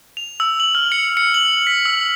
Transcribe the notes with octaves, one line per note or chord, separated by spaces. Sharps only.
F7
E6
F#7
F6
C#7
C#7
F#7
B6
E6